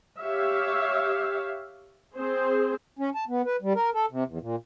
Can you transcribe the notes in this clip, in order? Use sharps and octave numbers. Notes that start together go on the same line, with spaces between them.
G4 C#5 E5 F5
C4 G#4 C5
C#4
A5
B3
B4
G3
A#4
A4
C3
E2
A#2